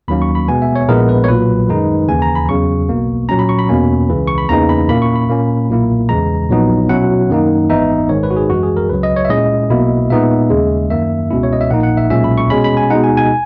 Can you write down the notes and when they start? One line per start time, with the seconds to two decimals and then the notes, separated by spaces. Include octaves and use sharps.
0.08 D#2 D#3 F#3 A#3 C#4 B5
0.22 C#6
0.35 B5
0.48 B2 G#3 B3 G#5
0.62 E5
0.76 C#5
0.89 A#1 A#2 G#3 B3 E4 A#4
1.09 B4
1.24 C#5
1.28 B1 A#2 F#3 B4
1.69 F#2 D#3 G#3 D#4
2.08 D#2 C#3 E3 G#5
2.22 A#5
2.35 B5
2.48 E2 C#3 F#3 C#6
2.89 B1 B2 A#3
3.29 A#2 F#3 C#4 A#5
3.39 B5
3.49 C#6
3.59 B5
3.69 E2 B2 A#3 C#4
4.09 C#2 C#3 E3
4.27 C#6
4.38 B5
4.49 E2 C#3 E3 A#3 D#4 A#5
4.69 B5
4.89 A#2 A#3 C#4 E4 B5
5.02 C#6
5.16 B5
5.30 A#2 A#3 C#4
5.69 B1 A#2 A#3 E4
6.09 E2 C#3 E3 G#3 A#5
6.49 A#1 A#2 F#3 B3 D#4
6.89 B2 F#3 C#4 E4 F#5
7.30 F#2 D#3 A#3 D#4
7.70 G#1 G#2 E3 B3 D#4 E5
8.09 G#1 G#2 D#3 C#5
8.23 B4
8.30 F#4
8.37 G#4
8.50 F#2 E3 G#3 F#4
8.63 G#4
8.77 A#4
8.89 C#2 C#3 F#3 B4
9.03 D#5
9.16 C#5
9.25 E5
9.30 A#2 G#3 C#4 E4 D#5
9.70 B1 B2 A#3 E4
10.10 A#2 G#3 B3 D#4 E5
10.50 D#2 C#3 G#3
10.90 F#2 D#3 A#3 E5
11.31 C#2 B2 G#3 C#4 E4
11.43 C#5
11.53 D#5
11.61 E5
11.70 A#1 A#2 A#3 D#4 F#5
11.83 F#5
11.97 E5
12.10 B1 A#2 G#3 C#4 E5
12.24 B5
12.38 C#6
12.50 B2 G#3 C#4 B5
12.64 B5
12.77 G#5
12.90 B2 G#3 D#4 F#5
13.04 G#5
13.17 G#5